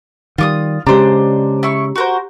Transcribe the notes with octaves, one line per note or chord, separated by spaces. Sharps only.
D#3 G3 F4 D6 D#6
C#3 G#3 D4 G4 C5 A#5
E4 C#6
F#4 A#4 C5